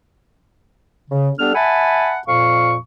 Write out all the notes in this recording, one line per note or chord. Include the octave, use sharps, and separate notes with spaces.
C#3
G3 B3 D4 A4 F6
E5 F#5 G#5 A5 B5
F2 A#2 F5 C#6